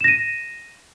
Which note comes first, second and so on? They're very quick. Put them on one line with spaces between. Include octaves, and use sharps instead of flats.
E7 A#6 D#7